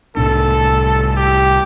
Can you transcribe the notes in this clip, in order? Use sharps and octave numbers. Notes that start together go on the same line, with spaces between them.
C2 A2 D4 A4
G4